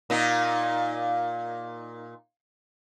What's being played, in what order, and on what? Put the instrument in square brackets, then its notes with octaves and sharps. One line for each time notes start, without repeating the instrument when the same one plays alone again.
[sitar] A#2 D#4